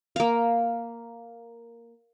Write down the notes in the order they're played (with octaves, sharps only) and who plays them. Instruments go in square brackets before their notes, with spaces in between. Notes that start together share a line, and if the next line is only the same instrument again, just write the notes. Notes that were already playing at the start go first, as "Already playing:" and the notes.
[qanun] A#3 F5